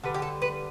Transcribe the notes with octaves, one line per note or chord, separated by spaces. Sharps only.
D3 G3 B4
G4
A4
B4